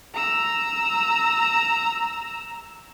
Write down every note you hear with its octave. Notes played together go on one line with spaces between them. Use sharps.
A#5 E6